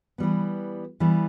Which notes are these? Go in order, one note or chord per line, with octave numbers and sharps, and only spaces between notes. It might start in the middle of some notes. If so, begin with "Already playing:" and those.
E3 G3 B3
E3 G3 B3